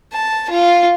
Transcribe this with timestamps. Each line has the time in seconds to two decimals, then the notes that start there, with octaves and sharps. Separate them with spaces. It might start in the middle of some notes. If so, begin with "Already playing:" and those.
0.12 A5
0.50 F4